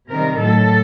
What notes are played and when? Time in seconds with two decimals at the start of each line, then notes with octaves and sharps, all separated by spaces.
0.10 C3 D#3 G3 A#4
0.40 A2 F#3 A4